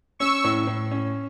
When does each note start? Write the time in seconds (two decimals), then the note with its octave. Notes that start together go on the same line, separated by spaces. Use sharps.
0.19 C#4 C#6 E6
0.44 A2
0.67 A2
0.91 C#4